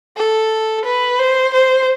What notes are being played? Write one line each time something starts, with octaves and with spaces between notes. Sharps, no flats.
A4
B4
C5
C5